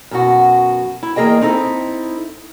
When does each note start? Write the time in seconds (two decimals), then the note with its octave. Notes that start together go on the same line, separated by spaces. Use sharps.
0.11 F#2 B2 F#4
1.03 E4
1.16 E2 A#3 G#4 D#5 G5
1.41 C4 D#4 E4 A4